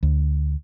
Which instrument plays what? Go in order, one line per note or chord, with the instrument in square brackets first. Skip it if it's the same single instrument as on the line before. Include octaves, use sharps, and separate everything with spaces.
[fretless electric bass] D2